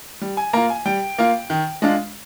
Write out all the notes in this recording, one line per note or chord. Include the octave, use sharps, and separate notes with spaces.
G3
G#5
A#3 F4 A#5
G#5
G3 G5
A#3 F4
D#3
G#3 D4 F4